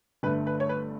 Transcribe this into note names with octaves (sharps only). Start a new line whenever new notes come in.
G1 G2 D3 A3 B4
B4
C#5
B4